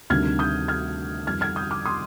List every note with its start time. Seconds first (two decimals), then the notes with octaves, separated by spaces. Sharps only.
0.10 D2 C3 D#3 G3 D4 F6 G#6
0.39 D#6 G6
0.68 F6 G#6
1.26 F2 D#3 G3 F6 G#6
1.41 F6 G#6
1.56 D#6 G6
1.71 D6 F6
1.85 C6 D#6